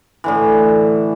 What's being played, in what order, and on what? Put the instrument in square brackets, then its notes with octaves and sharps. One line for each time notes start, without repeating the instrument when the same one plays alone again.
[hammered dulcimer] A2 D3 E3